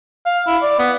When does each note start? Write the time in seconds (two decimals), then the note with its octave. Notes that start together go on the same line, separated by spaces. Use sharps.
0.26 F5
0.47 E4
0.62 D5
0.79 B3